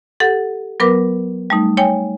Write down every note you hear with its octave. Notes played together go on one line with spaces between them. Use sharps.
G4 A4 F#5
F#3 B3 A#4 B4 D6
G3 A3 D#4
C#5 G5 G#5